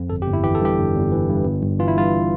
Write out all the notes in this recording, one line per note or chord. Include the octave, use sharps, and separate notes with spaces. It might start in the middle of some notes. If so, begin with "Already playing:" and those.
Already playing: F2
G1 A4
G4
G1
E4
E3 G4
A4
G2 G4
G1
G1
E3
G2
G1
G1
E3 F4
E4
G2 F4